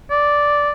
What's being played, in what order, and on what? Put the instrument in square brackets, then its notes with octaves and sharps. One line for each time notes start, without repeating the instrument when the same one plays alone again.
[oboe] D5